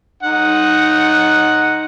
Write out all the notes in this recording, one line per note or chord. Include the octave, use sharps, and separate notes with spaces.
D#4 F#5